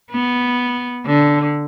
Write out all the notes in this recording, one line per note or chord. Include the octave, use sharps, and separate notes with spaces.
B3
D3